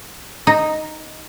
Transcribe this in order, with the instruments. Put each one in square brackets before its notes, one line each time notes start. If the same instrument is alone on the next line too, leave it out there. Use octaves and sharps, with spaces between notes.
[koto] D#4